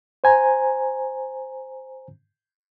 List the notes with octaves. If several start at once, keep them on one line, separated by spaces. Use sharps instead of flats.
C5 G#5 A#5